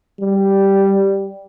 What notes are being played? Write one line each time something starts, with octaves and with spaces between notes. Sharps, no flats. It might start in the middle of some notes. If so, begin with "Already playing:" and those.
G3